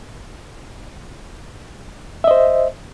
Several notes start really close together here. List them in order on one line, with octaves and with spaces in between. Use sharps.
E5 D#5 C5